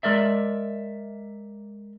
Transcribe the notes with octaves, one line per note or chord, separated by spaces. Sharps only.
G#3 A#4 D5 E5